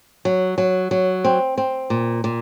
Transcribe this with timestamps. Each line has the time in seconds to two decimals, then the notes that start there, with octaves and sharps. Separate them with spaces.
0.25 F#3
0.58 F#3
0.91 F#3
1.24 C4
1.58 C4
1.90 A#2
2.24 A#2